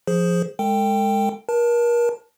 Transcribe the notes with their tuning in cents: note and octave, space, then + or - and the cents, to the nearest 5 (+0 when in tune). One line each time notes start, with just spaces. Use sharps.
F3 +0 G#4 +0 C5 +0
G#3 +0 A4 +40 G5 +0
A#4 +35 A5 +0